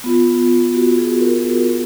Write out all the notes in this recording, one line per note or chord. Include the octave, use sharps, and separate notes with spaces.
B3 F4
F#4
G#4
A#4